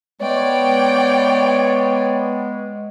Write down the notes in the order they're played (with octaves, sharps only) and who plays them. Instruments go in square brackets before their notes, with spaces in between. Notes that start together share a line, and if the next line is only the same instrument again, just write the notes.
[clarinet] G#3 [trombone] B3 [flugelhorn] C#5 [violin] D5 G5